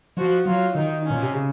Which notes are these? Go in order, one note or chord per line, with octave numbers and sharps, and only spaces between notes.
F3 F#4
F#3 F4
D#3 D#4
C#4
A#2
C3
C#3